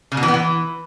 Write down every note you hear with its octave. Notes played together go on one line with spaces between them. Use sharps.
C#3
B2
E3
B3
E3